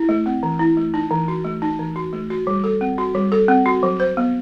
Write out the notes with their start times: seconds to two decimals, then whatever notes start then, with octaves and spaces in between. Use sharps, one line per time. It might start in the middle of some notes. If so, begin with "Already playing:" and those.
Already playing: E4
0.09 A3
0.26 C4
0.43 E3
0.59 E4
0.77 A3
0.94 D#4
1.11 E3
1.28 F#4
1.45 A3
1.62 D#4
1.79 E3
1.96 F#4
2.13 A3
2.30 F#4
2.47 G3
2.64 A4
2.81 C4
2.98 F#4
3.15 G3
3.32 A4
3.48 C4
3.66 F#4
3.83 F#3
4.00 C5
4.17 B3